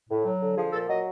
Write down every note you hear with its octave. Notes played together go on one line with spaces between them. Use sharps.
A2
F#3
D3
F3 G#4
A#2 A4
F#3 D#5